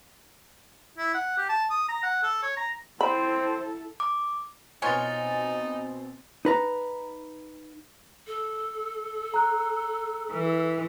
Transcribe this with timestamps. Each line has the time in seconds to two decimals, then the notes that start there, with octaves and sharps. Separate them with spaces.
0.98 E4
1.15 F#5
1.38 G4
1.49 A5
1.70 D#6
1.89 A#5
2.03 F#5
2.23 A4
2.43 C#5
2.57 A#5
3.01 C4 E4 A4 C5 B5
4.00 D6
4.82 B2 B3 C4 D#4 F4 C#5 G#5 A6
6.45 D#4 B4 A#5
8.27 A4
9.34 A#5 F#6
10.32 E3